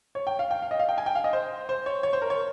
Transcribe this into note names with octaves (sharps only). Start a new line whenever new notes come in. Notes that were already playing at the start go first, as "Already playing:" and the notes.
C#5
G5
F5
G5
F5
D#5
F5
G5
G#5
G5
F5
D#5
C5
C5
C#5
C#5
C5
A#4
C#5